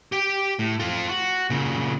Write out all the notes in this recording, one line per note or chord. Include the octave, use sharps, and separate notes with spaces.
G4 G5
A2
F4 A4
F#4
A#2 C#3